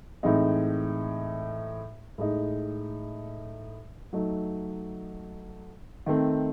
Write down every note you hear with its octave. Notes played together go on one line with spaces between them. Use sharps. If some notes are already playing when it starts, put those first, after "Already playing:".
A2 E3 G#3 C4 D#4
A2 G#3 D#4
F#3 A3 D#4
D#3 A3 C4